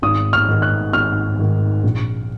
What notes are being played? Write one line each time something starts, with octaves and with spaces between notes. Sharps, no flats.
G#1 D#6
F6
G#2 D#3
F#6
G#1 F6
G#2 D#3
A#1